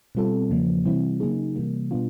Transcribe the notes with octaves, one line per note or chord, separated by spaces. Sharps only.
B2 G3 C4 F4 A4
E2 C#3 F3 A#3
C3 E3 G3 C4 E4
C#3 F#3 A#3 D#4 G#4
C3 E3 G3 A#3
B2 G3 B3 D4 F4